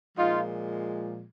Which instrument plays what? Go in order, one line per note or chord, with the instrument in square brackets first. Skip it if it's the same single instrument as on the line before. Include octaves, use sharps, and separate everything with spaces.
[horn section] A#2 F3 G#3 D#4 F4